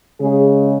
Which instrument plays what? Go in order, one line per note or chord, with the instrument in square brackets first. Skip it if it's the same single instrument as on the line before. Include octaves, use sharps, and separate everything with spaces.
[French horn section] C#3 G#3 G#4